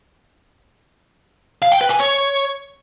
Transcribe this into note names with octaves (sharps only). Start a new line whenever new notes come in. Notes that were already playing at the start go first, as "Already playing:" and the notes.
F5
G5
B4
G#5
C#5